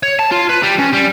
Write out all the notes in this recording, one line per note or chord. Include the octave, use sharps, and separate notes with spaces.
C#5
A5
F4
B4
G3
C#4
G3